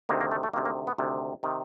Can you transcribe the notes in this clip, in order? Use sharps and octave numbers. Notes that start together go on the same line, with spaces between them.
D2 C3 D#3 A#3
A#3
A3
A3
D2 C3 D#3 A#3
A#3
B3
D2 C3 D#3
C3 D#3